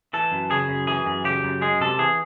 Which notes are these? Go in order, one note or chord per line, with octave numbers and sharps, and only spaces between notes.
E3 A4
F#2
C#3 G#4
F#2
E3 G#4
F#2
C#3 G4
F#2
G#3 G#4
C3 A4
E3 G#4